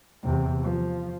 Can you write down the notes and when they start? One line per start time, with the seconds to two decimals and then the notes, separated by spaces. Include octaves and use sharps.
0.23 E2 C3
0.61 F3